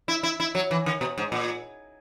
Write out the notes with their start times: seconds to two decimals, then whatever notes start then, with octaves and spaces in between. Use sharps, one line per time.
0.08 E4
0.23 E4
0.40 E4
0.55 F#3
0.71 E3
0.86 D#3
1.01 B2
1.18 G#2
1.32 A#2